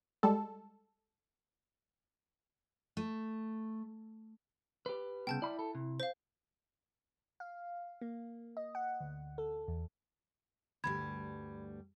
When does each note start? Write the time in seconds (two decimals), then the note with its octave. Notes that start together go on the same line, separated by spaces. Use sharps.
0.23 G3 G#3 A4
2.97 A3
4.86 G4 B4
5.27 C2 C#3 B3 G5 A5 G6
5.42 E4 D5 B5
5.59 A4
5.75 C3
6.00 C5 F5
7.40 F5
8.01 A#3
8.57 D#5
8.75 F#5
9.00 D2
9.38 A4
9.68 E2
10.84 D2 G2 G3 B5 G#6